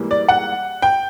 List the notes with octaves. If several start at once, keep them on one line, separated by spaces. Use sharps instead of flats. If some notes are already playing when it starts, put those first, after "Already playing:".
Already playing: G#2 E3 G3 A#3
D5
F#5
G5